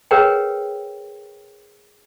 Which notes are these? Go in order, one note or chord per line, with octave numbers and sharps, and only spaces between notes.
G#4 A#4 B4 C#5 F#5 G5